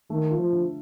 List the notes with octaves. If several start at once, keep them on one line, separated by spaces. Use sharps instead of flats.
D#3 A3
F4
F3
D3